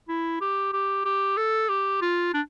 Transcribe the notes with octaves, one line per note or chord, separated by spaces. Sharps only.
E4
G4
G4
G4
A4
G4
F4
D4